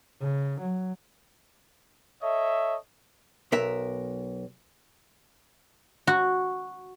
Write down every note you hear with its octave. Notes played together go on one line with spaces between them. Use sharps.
C#3
F#3
A4 C#5 D#5 E5
B1 A#4 E5
F#4